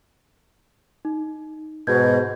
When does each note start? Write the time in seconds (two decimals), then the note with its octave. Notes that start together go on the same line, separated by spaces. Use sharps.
1.05 D#4
1.87 G#2 B2 G6 G#6